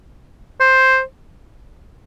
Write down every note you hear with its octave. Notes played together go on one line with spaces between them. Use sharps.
C5